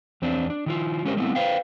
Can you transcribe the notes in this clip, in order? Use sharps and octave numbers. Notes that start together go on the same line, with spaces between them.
E2 C4 D4
D4
D#3 E4 F4
G#3 C#4 G4 A#4 C5
G3 A3 B3 C4 D#4 E4
B4 C5 F5 G5